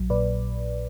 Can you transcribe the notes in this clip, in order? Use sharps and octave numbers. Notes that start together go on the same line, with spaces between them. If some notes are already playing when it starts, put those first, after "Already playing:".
Already playing: A#1 F#3
A#2 B4 D5